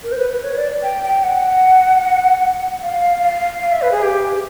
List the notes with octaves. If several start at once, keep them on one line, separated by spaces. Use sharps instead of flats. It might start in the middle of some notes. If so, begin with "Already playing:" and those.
A#4
C5
B4
B4
C#5
D5
G5
G5
F#5
F5
F5
F5
E5
B4
G#4
G4